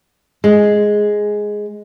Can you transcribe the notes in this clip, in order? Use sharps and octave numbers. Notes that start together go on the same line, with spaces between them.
G#3